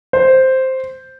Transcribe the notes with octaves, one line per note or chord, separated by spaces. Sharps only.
C5